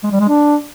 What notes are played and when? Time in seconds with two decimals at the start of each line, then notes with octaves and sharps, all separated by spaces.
0.03 G#3
0.12 G3
0.20 G#3
0.29 D4